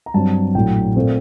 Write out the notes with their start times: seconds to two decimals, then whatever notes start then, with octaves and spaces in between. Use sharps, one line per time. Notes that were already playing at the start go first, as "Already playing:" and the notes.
0.06 A#5
0.14 G2 F#3 C4 A5
0.55 A#1 A2 F#3 G5
0.96 A#2 A3 C4